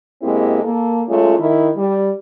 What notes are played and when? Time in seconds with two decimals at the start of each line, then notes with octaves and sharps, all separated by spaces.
0.22 B2 G#3 A#3 C4 E4 G4
0.63 A#3 A4
1.08 F#3 G#3 A3 C#4 F4
1.38 D#3 E4
1.76 G3